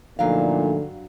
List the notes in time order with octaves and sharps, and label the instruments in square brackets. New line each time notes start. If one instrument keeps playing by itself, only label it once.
[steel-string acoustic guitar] G2 F#3 F5 [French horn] A#2 [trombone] D3 [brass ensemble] F3 A3 D#4